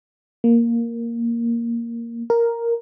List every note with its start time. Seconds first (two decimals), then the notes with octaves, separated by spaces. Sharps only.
0.44 A#3
2.30 A#4